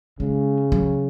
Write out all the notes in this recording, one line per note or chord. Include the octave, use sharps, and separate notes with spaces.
C#3 G#3
F#3